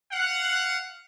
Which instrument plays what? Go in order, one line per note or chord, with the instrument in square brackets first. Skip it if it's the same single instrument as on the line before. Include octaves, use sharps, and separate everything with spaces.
[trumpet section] F5 F#5